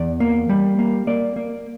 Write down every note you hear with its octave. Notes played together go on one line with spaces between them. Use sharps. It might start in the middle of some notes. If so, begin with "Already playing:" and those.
Already playing: E2 D5
A#3
G3
A#3
A#3 D5
A#3